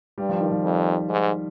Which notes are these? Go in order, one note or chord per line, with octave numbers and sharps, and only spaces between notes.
G2 G3
F3
D#3
F3
F2
G#2